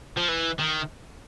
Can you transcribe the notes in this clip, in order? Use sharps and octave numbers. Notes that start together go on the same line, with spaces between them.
F3
E3
D#3